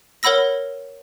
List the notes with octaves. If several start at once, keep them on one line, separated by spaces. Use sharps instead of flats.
A#4 C#5 F#5 B5 E6 A#6